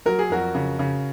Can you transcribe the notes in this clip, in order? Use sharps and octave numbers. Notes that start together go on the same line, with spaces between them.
F#3 A#4
G#4
F2 F#4 A#4
C#3
C#3